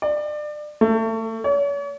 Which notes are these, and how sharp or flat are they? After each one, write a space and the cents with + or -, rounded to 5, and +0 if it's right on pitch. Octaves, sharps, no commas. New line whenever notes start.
D5 +30
A3 +30
C#5 +40